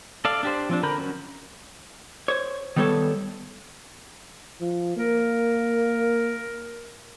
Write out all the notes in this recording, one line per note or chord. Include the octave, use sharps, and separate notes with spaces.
A4 D5 F5
D4 G4 C5
F3 C4 D4
D3 A#4 A#5 B5 G6
F#3 C#4
C5 C#5
D#3 G3 B3 A4 C#5 A5
F3
A#3 A#4